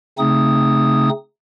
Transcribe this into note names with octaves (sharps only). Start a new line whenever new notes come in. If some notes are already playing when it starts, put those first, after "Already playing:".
C#3 A3 C4 D#4 D#6